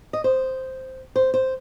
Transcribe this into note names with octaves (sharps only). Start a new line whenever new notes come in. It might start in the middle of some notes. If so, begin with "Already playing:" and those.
D#5
C5
C5
C5